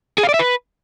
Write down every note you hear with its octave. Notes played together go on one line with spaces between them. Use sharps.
G#4
F5
D5
E5
B4